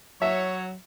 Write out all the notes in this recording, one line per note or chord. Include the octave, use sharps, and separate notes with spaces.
F#3 C#5 E5